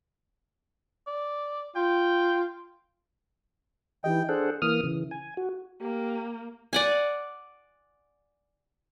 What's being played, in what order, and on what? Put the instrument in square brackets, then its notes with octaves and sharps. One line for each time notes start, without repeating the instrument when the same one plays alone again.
[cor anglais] D5
[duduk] F4 [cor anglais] G5
[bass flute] E3 [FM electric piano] D#4 G4 D#5 [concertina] G5
[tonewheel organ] D4 G#4 A4 C5 F#5
E3 A#3 D#6 F6
C#3 E3
G#5
F#4
[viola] A#3 [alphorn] G4
[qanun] D5 F#5 G#5